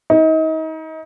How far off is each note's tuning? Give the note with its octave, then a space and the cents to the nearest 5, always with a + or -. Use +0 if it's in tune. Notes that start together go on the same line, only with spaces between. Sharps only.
D#4 +35